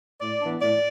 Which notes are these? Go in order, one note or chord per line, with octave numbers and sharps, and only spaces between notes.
A2 D5
E3 B3 D4
A2 D5